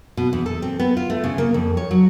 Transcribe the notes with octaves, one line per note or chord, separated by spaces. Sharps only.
B2
E2
A4
C4
B3
F4
A3
C#3
A#3
F2
C#5
F#3